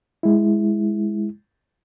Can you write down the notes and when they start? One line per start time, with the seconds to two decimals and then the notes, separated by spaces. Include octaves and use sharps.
0.23 G#3 E4